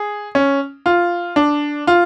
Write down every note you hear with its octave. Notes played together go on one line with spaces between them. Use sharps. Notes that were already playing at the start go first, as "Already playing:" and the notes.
Already playing: G#4
C#4
F4
D4
F4